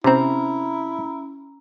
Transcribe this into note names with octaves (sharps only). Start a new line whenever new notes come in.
C3 C4 C#4 E4 A#5